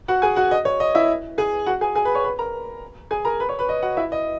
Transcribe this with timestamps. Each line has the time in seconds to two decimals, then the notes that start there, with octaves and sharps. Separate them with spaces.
0.08 F#4 F#5
0.22 G#4 G#5
0.36 F#4 F#5
0.51 D#5
0.65 C#5
0.80 D#5
0.95 E4 E5
1.38 G#4 G#5
1.66 F#4 F#5
1.81 G#4 G#5
1.95 G#4 G#5
2.05 B4 B5
2.15 C#5 C#6
2.24 B4 B5
2.39 A#4 A#5
3.11 G#4 G#5
3.25 A#4 A#5
3.40 B4 B5
3.49 C#5 C#6
3.59 B4 B5
3.69 D#5
3.83 F#4 F#5
3.97 E4 E5
4.12 D#5